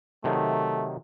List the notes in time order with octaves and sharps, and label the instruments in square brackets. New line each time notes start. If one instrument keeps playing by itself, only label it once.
[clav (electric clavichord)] C3 D#3 F#3 [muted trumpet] A3